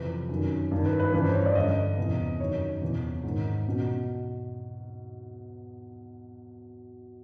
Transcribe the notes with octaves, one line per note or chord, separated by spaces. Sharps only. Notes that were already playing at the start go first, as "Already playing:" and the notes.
Already playing: F2 C3 E3 B4
F#2 D#3
G2 D#3
B4
B4
G2 E3 B4
C5
C#5
D5
G2 D3 D#5
E2 C3 E3
F#2 D#3 C#5
E2 C3 E3
G#2
D#3
B2